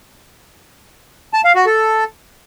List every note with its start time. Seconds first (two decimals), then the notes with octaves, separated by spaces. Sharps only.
1.34 A5
1.44 F5
1.55 F#4
1.66 A4